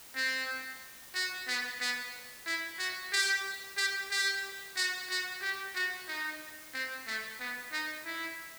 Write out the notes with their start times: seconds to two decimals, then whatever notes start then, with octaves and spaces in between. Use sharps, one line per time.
0.16 C4
1.15 F#4
1.47 B3
1.80 B3
2.46 E4
2.79 F#4
3.12 G4
3.77 G4
4.11 G4
4.76 F#4
5.10 F#4
5.42 G4
5.75 F#4
6.08 D#4
6.74 C4
7.07 A3
7.40 B3
7.72 D#4
8.05 E4